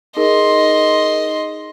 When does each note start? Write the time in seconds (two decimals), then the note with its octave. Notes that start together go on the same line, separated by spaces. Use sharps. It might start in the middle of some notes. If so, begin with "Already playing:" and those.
0.17 D#4 G#4 A#4 D#5 C6